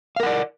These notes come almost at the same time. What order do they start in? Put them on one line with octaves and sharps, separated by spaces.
F5 A#4 F#5 D5